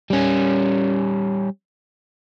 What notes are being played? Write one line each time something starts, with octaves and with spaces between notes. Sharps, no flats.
G3 C#4